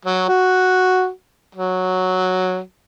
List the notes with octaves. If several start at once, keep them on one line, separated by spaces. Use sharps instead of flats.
F#3
F#4
F#3